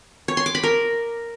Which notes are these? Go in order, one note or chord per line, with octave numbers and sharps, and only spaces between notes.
C#5
C6
D6
B5
A#4